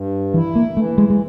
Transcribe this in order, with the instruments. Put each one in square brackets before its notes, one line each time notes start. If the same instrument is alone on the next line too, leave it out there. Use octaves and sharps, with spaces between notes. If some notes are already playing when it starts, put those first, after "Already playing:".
Already playing: [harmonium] G2
[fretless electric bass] E3 [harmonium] E4
[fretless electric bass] A#3
[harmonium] E3 [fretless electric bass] A3
[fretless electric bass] G#3
G#3